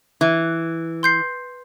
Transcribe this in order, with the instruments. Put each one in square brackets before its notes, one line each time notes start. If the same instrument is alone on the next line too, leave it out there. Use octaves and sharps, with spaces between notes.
[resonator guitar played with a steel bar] E3
[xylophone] C6 G6 C7